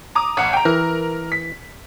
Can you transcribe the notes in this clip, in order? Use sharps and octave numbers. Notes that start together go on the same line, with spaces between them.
A#5 D6 D#6
A1 F#5
G5 A#5
E3 A#4
B6